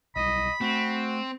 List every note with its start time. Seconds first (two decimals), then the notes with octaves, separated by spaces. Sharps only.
0.16 B1 G3 D#5 B5
0.61 A3 C4 F#4